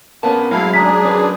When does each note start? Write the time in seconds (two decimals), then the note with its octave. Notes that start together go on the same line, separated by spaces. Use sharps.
0.23 A#2 A#3 B3 C#4 A5
0.51 F#3 G#3 A3 C#4 E4 F5
0.73 D4 G#4 A#5 B6
1.03 F#3 C#4 B4